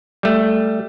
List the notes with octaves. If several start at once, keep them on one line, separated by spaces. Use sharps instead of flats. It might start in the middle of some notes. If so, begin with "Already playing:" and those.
G3 A3